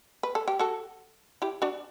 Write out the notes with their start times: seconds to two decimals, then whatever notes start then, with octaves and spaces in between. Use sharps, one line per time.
0.23 B4
0.35 A4
0.48 G4
0.59 F#4 A4
1.42 E4 G4
1.62 D4 F#4